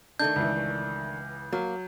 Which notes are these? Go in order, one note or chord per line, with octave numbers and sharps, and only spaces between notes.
D#3 A3 D4 G6
C#2 E3
F#3 A#3